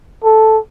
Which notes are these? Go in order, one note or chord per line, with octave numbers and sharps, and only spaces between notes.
A4